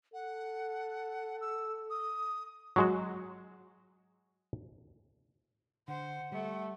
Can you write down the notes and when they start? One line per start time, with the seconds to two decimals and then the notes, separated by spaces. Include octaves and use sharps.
0.14 A4 F#5
1.41 E6
1.90 D#6
2.76 F#3 G#3 F#4
5.88 D3 C5 F#5
6.32 G3 A3